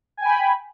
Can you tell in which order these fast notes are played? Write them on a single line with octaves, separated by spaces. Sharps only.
G#5 G5 B5